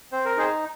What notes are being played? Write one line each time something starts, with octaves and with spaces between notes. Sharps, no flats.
C4 C5
A#4
D#4 G#4 C5